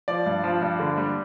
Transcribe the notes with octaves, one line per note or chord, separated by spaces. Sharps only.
F3 D5
G2
F3
G2
D3
G3